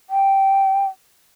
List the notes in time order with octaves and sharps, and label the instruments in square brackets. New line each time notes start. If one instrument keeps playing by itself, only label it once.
[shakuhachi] G5